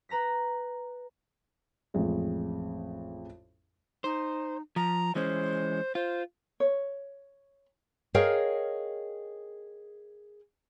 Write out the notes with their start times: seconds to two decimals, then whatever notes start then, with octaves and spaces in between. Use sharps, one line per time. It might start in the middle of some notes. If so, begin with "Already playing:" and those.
0.09 B4 A#5 A#6 B6
1.94 A1 F2 G#3
4.04 D#4 C5
4.76 F3 A#5
5.15 E3 G#3 C#4 C5
5.95 F4 C5
6.60 C#5
8.14 G#4 A#4 C#5 D#5 F5 G5